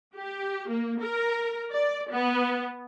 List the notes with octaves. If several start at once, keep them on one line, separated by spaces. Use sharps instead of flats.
G4
A#3
A#4
D5
B3